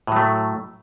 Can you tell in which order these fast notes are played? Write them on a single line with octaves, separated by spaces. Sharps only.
A2 F#3 A3